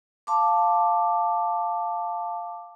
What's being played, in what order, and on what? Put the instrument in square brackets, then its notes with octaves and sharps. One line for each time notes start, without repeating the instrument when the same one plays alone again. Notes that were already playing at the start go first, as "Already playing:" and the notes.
[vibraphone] F5 A5 C6 D6